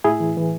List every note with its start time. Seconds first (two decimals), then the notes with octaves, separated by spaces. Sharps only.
0.04 A2 E4 G#4
0.20 E3
0.37 E3